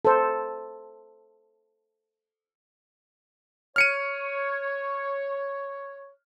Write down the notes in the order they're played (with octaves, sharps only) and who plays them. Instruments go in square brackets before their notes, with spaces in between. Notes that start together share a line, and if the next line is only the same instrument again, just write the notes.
[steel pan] A4 C5
[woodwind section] C#5 [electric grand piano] F6 C#7 D#7